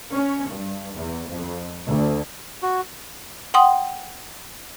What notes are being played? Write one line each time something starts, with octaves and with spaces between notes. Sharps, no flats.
C#4
G2
E2
F2
D2
F#4
F#5 G5 C6 D#6